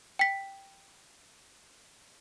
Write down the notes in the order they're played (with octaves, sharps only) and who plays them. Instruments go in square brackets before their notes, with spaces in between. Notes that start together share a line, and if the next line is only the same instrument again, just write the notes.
[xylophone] G5 B6